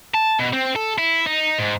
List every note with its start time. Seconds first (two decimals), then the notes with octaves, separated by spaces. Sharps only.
0.14 A5
0.40 B2
0.53 C4
0.76 A4
0.98 E4
1.26 D#4
1.59 G#2